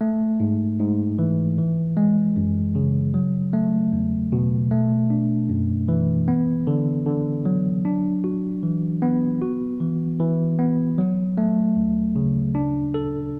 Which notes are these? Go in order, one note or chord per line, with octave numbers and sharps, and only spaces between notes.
A3
G#2
G#2
E3
E3
G#3
F#2
C#3
F#3
A3
E2
B2
A3
D4
F#2
E3
B3
D3
D3
F#3
D4
F#4
E3
B3
F#4
E3
E3
B3
F#3
A3
D2
C#3
D4
A4